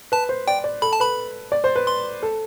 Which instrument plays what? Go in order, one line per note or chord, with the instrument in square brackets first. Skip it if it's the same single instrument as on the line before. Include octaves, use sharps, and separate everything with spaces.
[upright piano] B4 [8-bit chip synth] A5
[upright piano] C5
[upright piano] D5 [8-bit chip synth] G5
[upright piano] D5
[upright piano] A4 [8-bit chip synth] B5
[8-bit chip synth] A5
[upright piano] B4 [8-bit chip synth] B5
[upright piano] D5
C5
B4
[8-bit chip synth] C6
[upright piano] A4